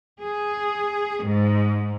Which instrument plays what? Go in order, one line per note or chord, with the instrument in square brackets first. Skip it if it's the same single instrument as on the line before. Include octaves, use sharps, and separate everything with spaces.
[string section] G#4
G#2